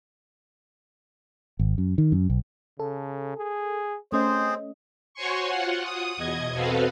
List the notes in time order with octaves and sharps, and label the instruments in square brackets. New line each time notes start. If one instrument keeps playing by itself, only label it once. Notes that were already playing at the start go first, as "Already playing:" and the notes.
[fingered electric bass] G#1
F#2
D#3
F#2
B1
[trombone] C#3 [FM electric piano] A4
[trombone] G#4
[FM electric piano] A3 C#4 D#5 [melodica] C4 G#4 [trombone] C5
[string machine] F#4 C5 C#5 G#5 C6 C#6
F4 F#5
D#6
E2 B2 D#5 G#6
C4 F#4 A4 B4 F5